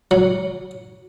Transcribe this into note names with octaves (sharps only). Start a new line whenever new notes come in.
F#3